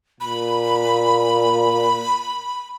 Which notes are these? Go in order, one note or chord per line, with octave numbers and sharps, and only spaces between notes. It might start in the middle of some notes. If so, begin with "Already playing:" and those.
A#2 B5